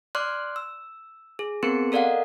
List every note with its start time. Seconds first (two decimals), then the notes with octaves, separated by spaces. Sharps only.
0.15 D5 C6 D6 F6 F#6
0.56 E6
1.39 G#4
1.63 B3 C4 G#4 A#4 C6 C#7
1.92 A4 A#4 D5 D#5 F5 F#5